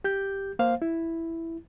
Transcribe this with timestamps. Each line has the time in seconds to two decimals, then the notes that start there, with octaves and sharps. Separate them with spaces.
0.04 G4 G6
0.59 A#3 C5 F5
0.82 E4